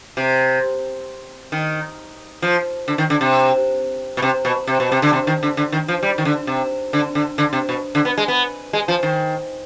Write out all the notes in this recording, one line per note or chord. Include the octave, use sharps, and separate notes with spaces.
C3
D#3
F3
D3
D#3
D3
C3
B2
C3
B2
C3
B2
C3
D3
C3
D#3
D3
D3
D#3
F3
G3
D#3
D3
C3
D3
D3
D3
C3
B2
D3
B3
G#3
B3
G#3
F3
D#3